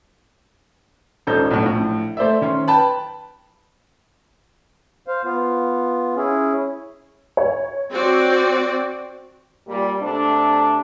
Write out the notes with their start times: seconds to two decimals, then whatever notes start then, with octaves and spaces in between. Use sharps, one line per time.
1.27 D#1 G#1 C#4 D#4 A4 G6
1.51 B1 A2
1.63 A#1 A2
2.17 A3 C5 D5 E5
2.41 D#3 C#4 C6
2.68 B4 G5 A5 B5
5.07 C5 F5
5.25 B3 F4
6.16 C#4 E4 G#4
7.37 C#5
7.92 C4 F#4 D5
9.68 A#2 G3
10.02 C3 A3 D4